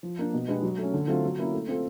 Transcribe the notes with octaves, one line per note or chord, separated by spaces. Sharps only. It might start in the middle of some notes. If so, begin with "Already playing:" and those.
F3
A#3 D4
B2
G#3 B3 D4 G4
F#3
A3 C#4
D3
F#3 A3 C4 F4
F#3
A#3 C#4 E4
A3
C4 F4 A4